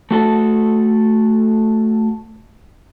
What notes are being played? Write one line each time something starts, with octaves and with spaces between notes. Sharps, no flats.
A3 F#4 A4